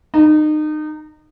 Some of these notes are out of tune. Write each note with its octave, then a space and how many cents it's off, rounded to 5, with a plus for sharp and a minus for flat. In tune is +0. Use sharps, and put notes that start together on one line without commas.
D#4 -30